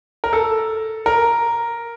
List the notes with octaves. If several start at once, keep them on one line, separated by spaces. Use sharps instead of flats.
A#4
A4
A#4